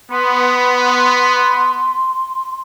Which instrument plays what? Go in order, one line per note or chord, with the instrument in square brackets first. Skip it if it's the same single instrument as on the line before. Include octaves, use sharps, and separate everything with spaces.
[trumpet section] B3 [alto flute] C6